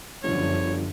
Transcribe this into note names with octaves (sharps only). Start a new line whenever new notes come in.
G1 F#2 D3 F3 C#5